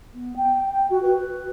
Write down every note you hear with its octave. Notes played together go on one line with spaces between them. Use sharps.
B3
G5
G5
F#4
B4
B4